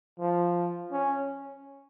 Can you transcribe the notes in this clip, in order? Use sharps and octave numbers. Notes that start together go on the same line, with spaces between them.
F3
C#4